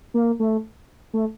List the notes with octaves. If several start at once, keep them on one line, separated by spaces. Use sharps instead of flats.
A#3
A3
A3